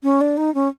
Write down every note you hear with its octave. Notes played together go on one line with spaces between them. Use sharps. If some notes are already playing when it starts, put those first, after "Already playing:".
C#4
D4
D#4
C#4